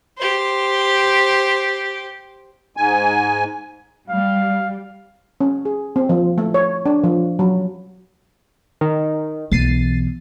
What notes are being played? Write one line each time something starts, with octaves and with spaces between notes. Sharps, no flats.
G4 C5
G#2 G#5
G3 F5
C#4
G#4
C4
F3
A3
C#5
D4
F3
F#3
D#3
B1 E3 A6 C7 D#7